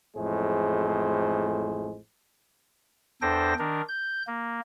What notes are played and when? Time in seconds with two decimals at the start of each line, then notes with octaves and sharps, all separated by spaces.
0.17 A1 F2 A2 G#3 G#4 C5
3.22 E2 D4 A4 C5 G5 A#6
3.59 D#3 D4 A#4
3.89 G6
4.27 A#3